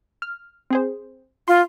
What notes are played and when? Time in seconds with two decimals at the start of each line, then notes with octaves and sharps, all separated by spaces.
0.22 F6
0.70 C4 G#4 C5
1.48 F4 C6